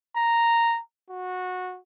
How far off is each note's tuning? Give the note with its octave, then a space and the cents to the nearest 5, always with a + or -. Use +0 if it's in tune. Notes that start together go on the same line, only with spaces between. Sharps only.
A#5 -5
F#4 -15